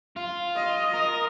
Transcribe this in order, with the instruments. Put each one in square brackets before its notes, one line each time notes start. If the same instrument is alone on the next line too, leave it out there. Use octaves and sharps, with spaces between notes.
[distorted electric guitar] F4
[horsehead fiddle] D#5
[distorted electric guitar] A#4